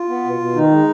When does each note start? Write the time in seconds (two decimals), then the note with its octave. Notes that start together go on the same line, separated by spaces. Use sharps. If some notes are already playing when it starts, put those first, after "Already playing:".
Already playing: F4
0.09 B3
0.25 B2
0.40 B2
0.55 D#3 D#4
0.71 G#3